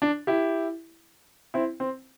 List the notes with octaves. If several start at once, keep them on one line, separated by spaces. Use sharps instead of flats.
D4
E4 G4
C4 E4
C4